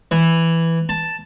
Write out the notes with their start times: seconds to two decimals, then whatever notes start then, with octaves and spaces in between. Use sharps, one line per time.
0.11 E3
0.89 A5